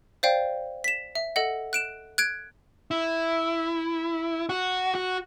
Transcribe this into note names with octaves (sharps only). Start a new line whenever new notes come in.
C5 D5 F5 G5
B6 E7
E5
A4 D#5 F#5
F#6 D7 E7
F#6 G#6 D7
E4
F#4
F#4